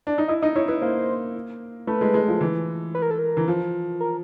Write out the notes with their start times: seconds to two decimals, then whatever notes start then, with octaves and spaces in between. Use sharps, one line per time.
0.07 D4
0.18 D#4
0.28 E4 D#5
0.42 D#4 D#5
0.56 E4 C#5
0.68 E4 B4
0.82 A#3 C5
1.87 A3 B4
2.01 G#3
2.14 G#3
2.28 F3
2.41 E3
2.95 B4
3.02 A#4
3.11 A4
3.19 A#4
3.37 E3
3.48 F3
4.00 A#4